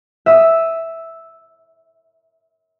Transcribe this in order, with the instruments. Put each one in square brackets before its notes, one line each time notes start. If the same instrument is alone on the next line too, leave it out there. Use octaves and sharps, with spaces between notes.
[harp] E5 D#6 E6